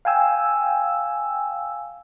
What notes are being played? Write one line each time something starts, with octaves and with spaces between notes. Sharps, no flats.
F5 G5 G#5 E6